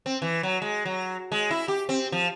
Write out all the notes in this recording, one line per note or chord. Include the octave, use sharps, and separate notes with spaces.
C4
E3
F#3
G#3
F#3
G#3
E4
G4
C4
F3